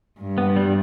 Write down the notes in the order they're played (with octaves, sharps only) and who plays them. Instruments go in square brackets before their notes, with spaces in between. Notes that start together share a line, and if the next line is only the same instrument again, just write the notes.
[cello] G2
[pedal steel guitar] B3
G3